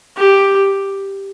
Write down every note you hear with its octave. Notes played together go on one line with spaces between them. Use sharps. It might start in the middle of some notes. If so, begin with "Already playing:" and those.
G4